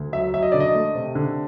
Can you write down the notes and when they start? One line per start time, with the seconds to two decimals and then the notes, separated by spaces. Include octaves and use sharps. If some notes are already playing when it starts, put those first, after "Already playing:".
Already playing: D2
0.12 F#3 E5
0.34 F#3 E5
0.43 D#5
0.52 D3 D5
0.60 D#5
0.74 A3
0.95 C3
1.15 D3